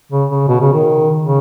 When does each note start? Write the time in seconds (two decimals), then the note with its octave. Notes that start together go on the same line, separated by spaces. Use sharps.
0.12 C#3
0.30 C#3
0.48 B2
0.61 C#3
0.73 D#3
1.23 C#3